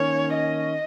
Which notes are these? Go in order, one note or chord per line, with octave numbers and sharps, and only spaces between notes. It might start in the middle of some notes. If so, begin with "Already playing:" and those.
Already playing: D#3 A#3 C#4 C#5
D#5